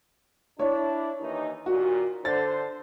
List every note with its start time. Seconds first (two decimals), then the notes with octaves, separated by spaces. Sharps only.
0.59 D4 E4 C#5
1.21 D#2 E3 D#4
1.66 D#2 A#2 F#4
2.25 D3 C5 A6